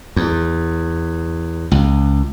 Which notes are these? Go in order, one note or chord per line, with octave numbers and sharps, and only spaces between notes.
E2
C#2